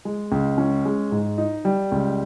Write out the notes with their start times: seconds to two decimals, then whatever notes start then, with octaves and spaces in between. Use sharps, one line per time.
0.05 G#3
0.32 C#2
0.58 C#4
0.86 G#3
1.12 G#2
1.38 D#4
1.65 G3
1.92 C#2